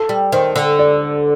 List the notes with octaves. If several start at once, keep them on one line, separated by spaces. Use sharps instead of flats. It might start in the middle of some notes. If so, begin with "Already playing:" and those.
Already playing: A4
G3
D#3 C5
D3
D5